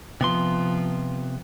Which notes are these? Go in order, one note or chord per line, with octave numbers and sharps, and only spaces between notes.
C3 F3 B3 C6